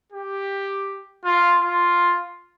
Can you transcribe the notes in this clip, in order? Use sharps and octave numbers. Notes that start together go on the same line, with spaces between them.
G4
F4
F4